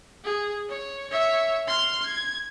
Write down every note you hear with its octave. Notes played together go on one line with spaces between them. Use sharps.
G#4
C#5
C#5 E5
C6 F6
G#6